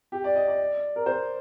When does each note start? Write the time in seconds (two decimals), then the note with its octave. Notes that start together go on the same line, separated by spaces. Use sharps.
0.12 G4
0.24 D5
0.35 D#5
0.48 D5
0.96 A#4
1.06 C5